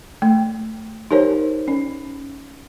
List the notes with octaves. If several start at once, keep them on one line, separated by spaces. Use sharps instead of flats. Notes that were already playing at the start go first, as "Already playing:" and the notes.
A3
D#4 G4 A#4 C5 C#5
C#4